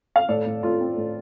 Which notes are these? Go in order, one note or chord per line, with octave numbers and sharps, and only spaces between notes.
F5
A2 A4 D5
A2
A2 F4 A4
C4
A2